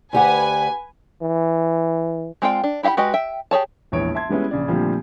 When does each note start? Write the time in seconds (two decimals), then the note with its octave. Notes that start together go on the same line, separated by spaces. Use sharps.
0.13 D2 G4 B4 F#5 G#5
1.22 E3
2.42 G#3 C4 F4 D5 G5
2.64 D4
2.83 E4 G4 F5 F#5 B5
2.97 G#3 F#4 G4 B4 D#5
3.14 E5 G5
3.51 G4 G#4 C#5 A5
3.92 E1 A#1 E3 C#5 D7
4.15 E5 A5 C6 G#6
4.29 G3 G#3 B3 C#4 E4
4.51 A#1 C#3 D5
4.68 A#2 D3 F3 G3 A3 C4